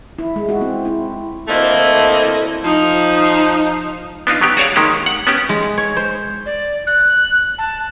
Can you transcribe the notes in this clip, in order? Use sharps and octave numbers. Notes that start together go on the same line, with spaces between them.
E4
G#3
F#4
C4
E4
D2 A3 A#3 C4 E4 D#5
F3 D#4
B3 D4 D#4 F4
F#3 B3 G4
F#4 G#4 C#5 D5 F5
D#3 G#3 A#3 G4
F#5
B3 C#4 G4
G#3
C#5
C5
D5
F#6
A5